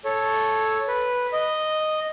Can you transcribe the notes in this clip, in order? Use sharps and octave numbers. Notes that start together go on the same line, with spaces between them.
A4 C#5
B4
D#5